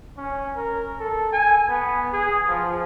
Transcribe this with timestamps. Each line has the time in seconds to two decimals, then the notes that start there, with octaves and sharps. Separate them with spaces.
0.17 C#4
0.56 A#4
0.99 A4
1.32 G#5
1.69 B3
2.13 G#4
2.48 F3